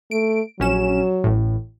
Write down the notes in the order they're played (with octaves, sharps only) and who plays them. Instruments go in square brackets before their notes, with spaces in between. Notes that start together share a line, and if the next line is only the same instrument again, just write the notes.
[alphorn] A3 [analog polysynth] D7
[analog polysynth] A#1 C#4 E7 [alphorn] F#3
[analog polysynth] A1 A2